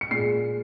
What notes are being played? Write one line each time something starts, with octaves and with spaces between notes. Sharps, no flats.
C#7
A#2 G#3 C7